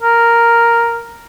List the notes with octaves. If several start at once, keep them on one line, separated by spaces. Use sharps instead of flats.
A#4